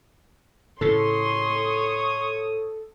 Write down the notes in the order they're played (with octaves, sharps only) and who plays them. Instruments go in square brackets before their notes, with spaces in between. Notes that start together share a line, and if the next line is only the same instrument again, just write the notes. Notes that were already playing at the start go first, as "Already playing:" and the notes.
[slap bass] A2 C#3 [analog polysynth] A4 [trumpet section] C#5 C#6 D#6 [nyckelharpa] C6